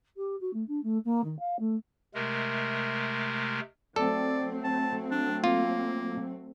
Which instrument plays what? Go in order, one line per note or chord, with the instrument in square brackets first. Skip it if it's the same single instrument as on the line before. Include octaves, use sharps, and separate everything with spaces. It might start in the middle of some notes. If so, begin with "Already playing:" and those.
[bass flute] G4
F#4
A3
D4
A3
A#3
D#3
F5
A3
[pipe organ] C3 G#3 A3 A#4
[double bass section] F#3 A3 C4 [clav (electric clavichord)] A4 [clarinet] D5
[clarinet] A5
D4
[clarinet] A#3 [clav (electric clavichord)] F4